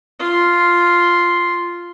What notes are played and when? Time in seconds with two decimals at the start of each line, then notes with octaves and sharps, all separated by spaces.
0.19 F4 C6